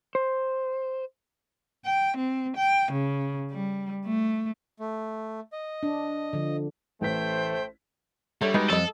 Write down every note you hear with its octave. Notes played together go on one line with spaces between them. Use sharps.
C5
G5
C4
G5
C#3
G3
A3
A3
D#5
D4
D3 F3
A1 A3 B4 C5 G5 B6
D3 G3 A3 C#5
G#3 B3 D#4 F#4
F2 A4 C#5 D#5